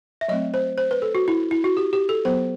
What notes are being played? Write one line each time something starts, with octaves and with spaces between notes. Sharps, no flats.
E5
F#3 A3 C4 D#5
C5
C5
B4
A4
F#4
E4
E4
F#4
G4
G4
A4
F#3 B3 C5